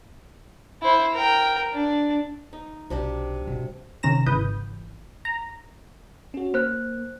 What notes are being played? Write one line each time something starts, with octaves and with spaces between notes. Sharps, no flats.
E4 C5
A#4 G5
D4
D#4
B1 C3 D4 G4
B2 A3
C3 D#3 C#4 A#5 A#6 E7
G#1 C#3 E3 B4 D#6 G6
A#5
C#4 F#4
A#3 C5 F#6